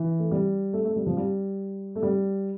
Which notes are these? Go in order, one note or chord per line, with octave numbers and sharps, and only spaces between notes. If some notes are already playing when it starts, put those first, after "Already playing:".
Already playing: E3
A3
G3
A3
A3
G3
F3
G3
A3
G3